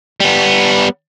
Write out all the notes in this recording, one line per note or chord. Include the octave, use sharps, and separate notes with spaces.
G3 B3